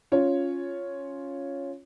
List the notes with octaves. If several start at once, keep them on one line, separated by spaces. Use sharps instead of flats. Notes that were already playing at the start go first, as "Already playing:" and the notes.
C#4 F4 C#5